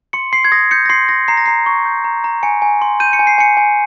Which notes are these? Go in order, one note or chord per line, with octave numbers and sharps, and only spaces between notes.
C6 C#7
C6 C7
G#6
D#6 A#6
G6 C#7
A#6
C6 C7
C6 A#6
A#5 C7
A#6
A#5 C7
C#6
G6
A#5
A#5
G#5 C#7
G#5
C6
G6 D#7
C#7
G#5
C7
G#5 C#7
G#5